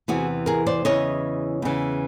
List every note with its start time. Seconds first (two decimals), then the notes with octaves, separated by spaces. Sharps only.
0.08 E2 C3 E3 F#4 G#4
0.46 G#4 A#4
0.66 C5 D5
0.85 E2 C#3 E3 C#5 D#5
1.62 E2 C#3 E3